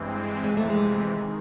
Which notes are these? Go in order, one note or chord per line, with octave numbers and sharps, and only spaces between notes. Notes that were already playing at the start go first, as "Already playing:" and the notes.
Already playing: G2 E3 G#3 C4
F2 C3 E3 G#3
A3
G#3
D#3